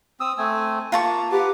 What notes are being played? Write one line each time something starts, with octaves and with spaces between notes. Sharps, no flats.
C4 D#6 E6
A3 C4 G#5
A#3 F4 A5 A#5 C#6
G4 B4 F#5 D6